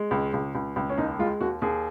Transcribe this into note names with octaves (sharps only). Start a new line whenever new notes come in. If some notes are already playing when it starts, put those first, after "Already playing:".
Already playing: G#3
C#2
C#2
C#2
C#2
C#4
D#2 D#4
G#3 F4
D#2 F#4
D#2 G#4